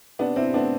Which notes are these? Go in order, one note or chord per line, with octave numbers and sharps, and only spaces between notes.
C3 B3 D4
C3 C4 E4
A3 B3 D4